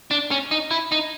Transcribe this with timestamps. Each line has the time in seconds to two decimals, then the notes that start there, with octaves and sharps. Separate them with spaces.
0.11 D4
0.31 C#4
0.51 D#4
0.71 E4
0.92 D#4